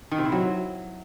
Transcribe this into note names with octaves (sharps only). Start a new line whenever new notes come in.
D#3
C3
E4
F#3